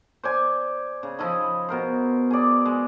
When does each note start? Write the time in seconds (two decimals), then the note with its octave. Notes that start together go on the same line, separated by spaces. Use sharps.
0.23 C5 D5 G#5
1.03 C#3
1.19 F3 E4 D#5 B5
1.69 B2 A#4 C5
2.31 G#4 D5
2.66 G#3